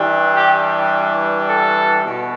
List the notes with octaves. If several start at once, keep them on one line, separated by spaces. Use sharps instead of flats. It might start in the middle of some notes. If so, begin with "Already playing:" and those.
Already playing: G2 E3 G3
G4
A4
B2